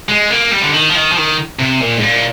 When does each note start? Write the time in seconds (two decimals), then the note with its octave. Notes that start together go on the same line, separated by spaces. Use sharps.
0.09 G#3
0.31 A#3
0.51 G3
0.62 D3
0.74 D#3
0.89 F3
0.95 D#3
1.12 F3
1.17 D#3
1.59 C3
1.81 A#2
1.97 G#2
2.03 A#2